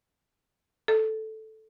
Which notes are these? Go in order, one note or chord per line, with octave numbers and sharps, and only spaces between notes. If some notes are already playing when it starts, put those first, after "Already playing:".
A4